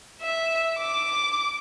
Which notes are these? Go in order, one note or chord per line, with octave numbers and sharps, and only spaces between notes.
E5
D6